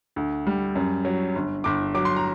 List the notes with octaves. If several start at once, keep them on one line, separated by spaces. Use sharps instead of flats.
D2
G3
F#2
F#3
G1
G1 D6
F#3 D6
C6
A#5